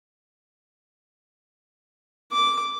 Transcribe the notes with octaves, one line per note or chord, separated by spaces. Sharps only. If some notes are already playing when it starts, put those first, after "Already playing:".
D6